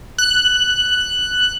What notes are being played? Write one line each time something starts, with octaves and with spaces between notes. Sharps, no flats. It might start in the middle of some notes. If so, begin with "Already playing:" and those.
F#6